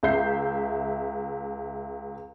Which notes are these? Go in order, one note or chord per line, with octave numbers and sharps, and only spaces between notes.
C#2 E5 G6 C7